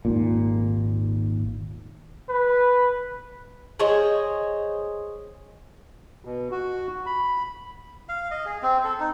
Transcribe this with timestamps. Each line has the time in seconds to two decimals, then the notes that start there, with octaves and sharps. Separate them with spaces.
0.05 G#1 D#2 A#2
2.29 B4
3.80 G#4 C5 C#5 D#5
6.25 B2
6.51 F#4
7.06 B5
8.09 F5
8.31 D#5
8.46 G#4
8.62 C4
8.84 A4
9.00 D#4